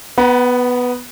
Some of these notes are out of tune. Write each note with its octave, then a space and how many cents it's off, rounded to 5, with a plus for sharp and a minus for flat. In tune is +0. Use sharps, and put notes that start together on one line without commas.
B3 +0 F#5 +40 A#5 +45